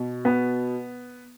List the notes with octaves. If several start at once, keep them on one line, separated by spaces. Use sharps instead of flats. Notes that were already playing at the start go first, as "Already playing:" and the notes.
Already playing: B2
B3